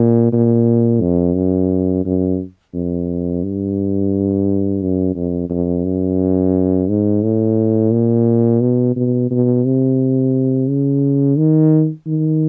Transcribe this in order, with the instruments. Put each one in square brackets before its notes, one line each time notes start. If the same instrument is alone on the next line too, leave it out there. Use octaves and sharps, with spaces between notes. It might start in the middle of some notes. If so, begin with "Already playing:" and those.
Already playing: [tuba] A#2
A#2
F2
F#2
F#2
F2
G2
F#2
F2
F2
F#2
G#2
A2
A#2
B2
B2
B2
C3
C#3
D#3
D#3